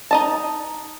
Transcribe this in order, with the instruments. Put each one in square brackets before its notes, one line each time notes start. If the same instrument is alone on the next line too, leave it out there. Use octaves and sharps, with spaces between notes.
[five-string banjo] D#4 D#5 A5